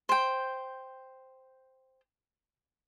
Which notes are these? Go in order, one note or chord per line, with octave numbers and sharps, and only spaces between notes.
C5 G5